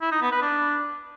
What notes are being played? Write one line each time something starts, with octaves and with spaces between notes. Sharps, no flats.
E4
D#4
B3
B4
D4